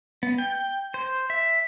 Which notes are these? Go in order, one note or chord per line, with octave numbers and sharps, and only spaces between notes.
B3
G5
C5
E5